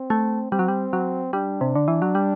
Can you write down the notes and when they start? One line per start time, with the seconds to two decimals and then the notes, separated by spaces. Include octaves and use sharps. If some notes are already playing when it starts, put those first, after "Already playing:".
Already playing: C4
0.10 A3
0.51 G3 C4
0.59 F#3
0.68 G3
0.93 F#3
1.33 G3 D4
1.61 C3
1.75 D3
1.88 E3
2.02 F#3
2.15 G3